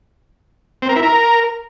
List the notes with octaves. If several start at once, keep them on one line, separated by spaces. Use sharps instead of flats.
C4
A#4
E4
A#4